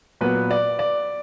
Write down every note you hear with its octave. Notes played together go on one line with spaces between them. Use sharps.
A#2 F#3 B3 B4
D5
D5